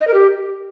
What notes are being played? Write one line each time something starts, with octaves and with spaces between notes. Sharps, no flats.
D#5
A#4
G4